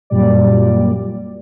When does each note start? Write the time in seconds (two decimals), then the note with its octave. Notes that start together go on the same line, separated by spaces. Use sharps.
0.10 F#2 A#2 G3 D5